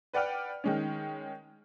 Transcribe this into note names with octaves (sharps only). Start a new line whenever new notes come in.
B4 D5 F#5 G5 F6
D#3 G#3 C#4